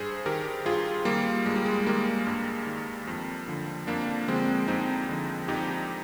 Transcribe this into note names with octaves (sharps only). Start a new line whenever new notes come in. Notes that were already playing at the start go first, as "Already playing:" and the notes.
Already playing: G2 G#4 C5
D#3 G4 A#4
G2 F4 G#4
D#3 G3 A#3
G2 G#3
G3
G#3
D#3 G3 A#3
G2
D#3
F2
D3 F3
F2 A#3 D4
D3 F3 G#3 C4
F2 C4 D#4
D3 F3
F2 D#4 G4